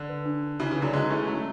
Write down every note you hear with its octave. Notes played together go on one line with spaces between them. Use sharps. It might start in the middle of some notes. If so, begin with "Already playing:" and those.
Already playing: D3
B4
D4
D4
C#3 E3 F#4
C#3 E3
C#5
D3 F#3
E3 G#3 C#5
A3 C#4 A4
F#3 A3 F#4